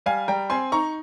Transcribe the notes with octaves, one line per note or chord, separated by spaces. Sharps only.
G3 F5 G#5
G3 G5 A#5
C4 G#5 C6
D#4 A#5 C#6